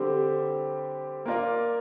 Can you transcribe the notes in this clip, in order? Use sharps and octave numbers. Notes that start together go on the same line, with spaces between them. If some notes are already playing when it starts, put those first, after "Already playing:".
Already playing: D3 G3 C4 G4
A#3 F4 A#4 D5